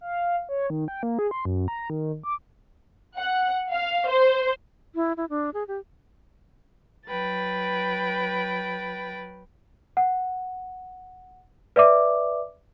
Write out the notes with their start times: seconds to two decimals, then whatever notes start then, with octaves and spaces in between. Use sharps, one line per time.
0.01 F5
0.49 C#5
0.70 D#3
0.88 G5
1.03 A#3
1.19 G#4
1.31 C6
1.45 F#2
1.68 A#5
1.90 D#3
2.23 D6
3.17 F#5
3.72 F5
4.08 C5
4.95 E4
5.17 E4
5.30 D4
5.54 G#4
5.68 G4
7.08 F#3 B4 G5 A6
9.97 F#5
11.76 B4 D5 E5 D6